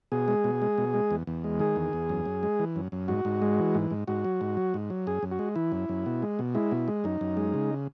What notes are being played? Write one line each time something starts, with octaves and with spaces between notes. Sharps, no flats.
B2 G#4
G#3
B2
G#3
B2
G#3
E2
E2
G#3
D#3 G#4
E2
E2
F#2
F#2
G#3
E3
F#2
F#2
G#2 F#4
G#2
G#3
E3
G#2
G#2
G#2 F#4
F#3
G#2
F#3
G#2
F#3
F#2 G#4
F#2
F#4
G#3
E3 E4
F#2
F#2
B2
G#3
B2
G#3 E4
B2
G#3
F#2 D#4
F#2
G#3
C#3